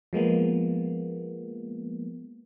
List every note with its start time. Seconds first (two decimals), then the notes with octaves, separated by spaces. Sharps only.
0.13 F3 G#3 A#3 B3